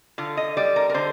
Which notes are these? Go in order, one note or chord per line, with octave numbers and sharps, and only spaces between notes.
D3 F4
D#5
G3 D5
A#4
A#4
D3 C5